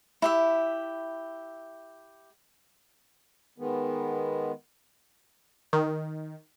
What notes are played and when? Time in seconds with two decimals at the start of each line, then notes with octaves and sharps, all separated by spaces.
0.22 E4 G4 E5
3.58 D#3 G#3 B3
5.73 D#3